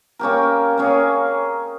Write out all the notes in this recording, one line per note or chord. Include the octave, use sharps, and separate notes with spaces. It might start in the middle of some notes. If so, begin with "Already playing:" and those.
A#3 C#4 G4 A#4
A#3 C#4 G#4